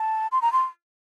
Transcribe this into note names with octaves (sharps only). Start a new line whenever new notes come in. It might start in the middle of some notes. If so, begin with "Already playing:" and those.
Already playing: A5
C6
A#5
C6